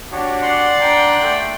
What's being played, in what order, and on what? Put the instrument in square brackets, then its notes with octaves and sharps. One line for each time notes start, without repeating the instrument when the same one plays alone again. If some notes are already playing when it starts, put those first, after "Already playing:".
[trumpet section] D4 F#4 G4 [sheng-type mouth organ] C#5
[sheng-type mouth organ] D5 F#5 C6
[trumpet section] D4 G5 A#5
A3 G5